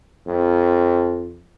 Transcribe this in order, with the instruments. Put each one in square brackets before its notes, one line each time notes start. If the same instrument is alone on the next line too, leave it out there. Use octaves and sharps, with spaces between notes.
[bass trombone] F2